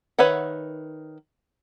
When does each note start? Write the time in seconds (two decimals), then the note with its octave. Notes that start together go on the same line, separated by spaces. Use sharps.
0.19 D#3 B4 C#5 E5 F#5